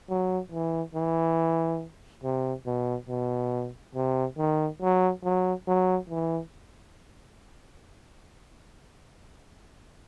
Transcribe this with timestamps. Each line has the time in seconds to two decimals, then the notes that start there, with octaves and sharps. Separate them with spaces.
0.09 F#3
0.52 E3
0.95 E3
2.23 C3
2.66 B2
3.09 B2
3.95 C3
4.38 D#3
4.82 F#3
5.23 F#3
5.68 F#3
6.10 E3